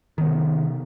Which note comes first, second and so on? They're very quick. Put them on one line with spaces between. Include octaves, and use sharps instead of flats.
D#3 B3 C3